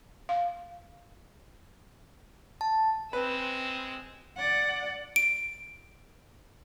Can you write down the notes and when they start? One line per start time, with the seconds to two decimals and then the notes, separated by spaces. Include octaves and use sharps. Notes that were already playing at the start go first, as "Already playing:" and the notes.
0.29 F5
2.61 A5
3.13 G#3 C4 B4 E6
4.37 D5 F#5
5.16 D7